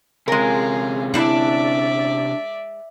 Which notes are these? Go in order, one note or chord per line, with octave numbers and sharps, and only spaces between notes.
C3 G#3 C#4 F4 G#4 A#4
D4 E4 D5 E5